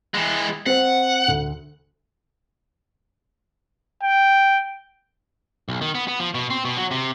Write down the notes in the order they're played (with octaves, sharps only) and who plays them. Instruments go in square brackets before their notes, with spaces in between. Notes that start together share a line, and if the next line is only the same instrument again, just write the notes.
[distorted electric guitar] E3 G#3
[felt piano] C4 C5 [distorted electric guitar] F#5
[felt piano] D2
[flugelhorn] G5
[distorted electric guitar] B1
D#3
B3
B3
F3
B2
C4
B2
F#3
C3